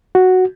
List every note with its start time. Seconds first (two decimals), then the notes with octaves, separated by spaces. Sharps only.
0.15 F#4